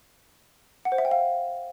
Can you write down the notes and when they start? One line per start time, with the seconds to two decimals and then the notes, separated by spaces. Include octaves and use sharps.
0.85 F#5
0.92 C5
0.98 E5
1.05 G5
1.11 F5